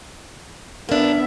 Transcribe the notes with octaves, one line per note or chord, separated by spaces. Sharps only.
A#3 B3 D4 E5